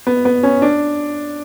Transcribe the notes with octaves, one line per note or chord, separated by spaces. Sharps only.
B3
B3
C#4
D4